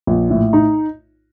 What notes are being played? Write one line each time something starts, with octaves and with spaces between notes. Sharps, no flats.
A#1
A2
D#4